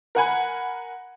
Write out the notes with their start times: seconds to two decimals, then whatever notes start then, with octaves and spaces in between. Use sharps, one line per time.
0.15 A#4 F#5 G#5 B5